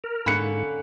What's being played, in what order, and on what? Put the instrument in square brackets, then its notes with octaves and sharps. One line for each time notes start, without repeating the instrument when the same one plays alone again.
[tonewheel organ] A#4
[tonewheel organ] G#2 [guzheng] D3 A#3 C#4 [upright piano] B5 F#6 C#7